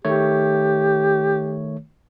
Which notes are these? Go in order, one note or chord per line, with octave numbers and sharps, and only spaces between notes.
D#3 A3 G4 C#5